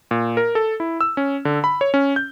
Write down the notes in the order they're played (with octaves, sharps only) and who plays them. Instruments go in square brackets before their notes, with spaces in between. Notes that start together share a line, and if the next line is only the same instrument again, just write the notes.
[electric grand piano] A#2
A#4
A4
E4
E6
C#4
D3
B5
C#5
C#4
G6